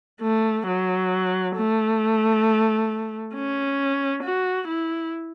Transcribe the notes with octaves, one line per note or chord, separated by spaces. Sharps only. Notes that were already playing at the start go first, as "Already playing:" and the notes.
A3
F#3
A3
C#4
F#4
E4